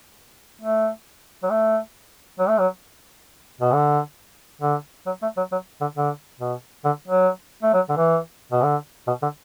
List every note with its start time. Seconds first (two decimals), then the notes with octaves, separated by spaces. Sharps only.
0.62 A3
1.43 F#3
1.50 A3
2.39 F#3
2.49 A3
2.59 F#3
3.61 B2
3.73 D3
4.62 D3
5.06 F#3
5.22 A3
5.37 F#3
5.52 F#3
5.81 D3
5.96 D3
6.40 B2
6.84 D3
7.08 F#3
7.63 A3
7.74 F#3
7.89 D3
7.97 E3
8.52 B2
8.63 D3
9.07 B2
9.22 D3